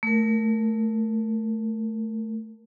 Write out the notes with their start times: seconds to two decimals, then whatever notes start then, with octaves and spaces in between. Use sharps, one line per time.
0.03 A3 A#4